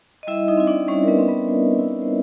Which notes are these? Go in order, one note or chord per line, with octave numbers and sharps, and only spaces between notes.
D#5
G3 E4 E5
D#4 D#5
C4 E4
D4 D5
G3 C#4 C#5
A#4
B3 B4
C4 E4
B3 B4
G3
C4 E4
C5